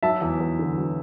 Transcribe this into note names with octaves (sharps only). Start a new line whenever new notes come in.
F#3 E5 A5
E2
E2
D3
F#3